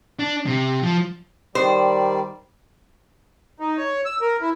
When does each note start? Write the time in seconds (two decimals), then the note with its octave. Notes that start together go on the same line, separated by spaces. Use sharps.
0.19 D4
0.46 C3
0.83 F3
1.55 D#3 G3 C5 D5
3.60 D#4
3.77 C#5
4.05 E6
4.21 A#4
4.41 E4